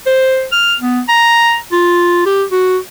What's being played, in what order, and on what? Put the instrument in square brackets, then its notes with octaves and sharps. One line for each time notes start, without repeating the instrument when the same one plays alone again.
[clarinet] C5
F6
B3
A#5
F4
G4
F#4